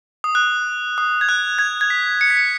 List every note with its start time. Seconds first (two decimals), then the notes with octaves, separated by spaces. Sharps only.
0.24 D#6
0.35 F#6
0.98 D#6
1.21 G#6
1.29 F#6
1.59 G#6
1.81 G#6
1.90 B6
2.21 C#7
2.30 B6
2.37 C#7